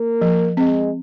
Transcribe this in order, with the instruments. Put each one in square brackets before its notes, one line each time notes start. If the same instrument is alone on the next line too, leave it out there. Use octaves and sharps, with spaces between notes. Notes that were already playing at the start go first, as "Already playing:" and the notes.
Already playing: [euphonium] A#3
[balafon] F3
[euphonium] G#3 [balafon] C4